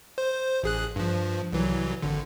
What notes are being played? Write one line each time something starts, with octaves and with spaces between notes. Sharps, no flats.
C5
A1 G#4 F#6
G2 F3
C2 E3 F#3
G#1 D3